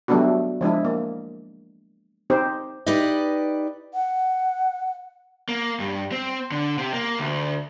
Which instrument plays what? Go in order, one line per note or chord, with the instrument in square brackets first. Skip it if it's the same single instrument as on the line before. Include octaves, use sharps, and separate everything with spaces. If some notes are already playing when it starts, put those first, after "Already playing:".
[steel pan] F#3 G3 A3 B3 D4 F#4
F3 G#3 D4 E4
A#3
C4 D#4 G4 C5
[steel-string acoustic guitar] D#4 G4 B4 D5 D#5
[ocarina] F#5
[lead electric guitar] A#3
G2
C4
D3
C3
A#3
D2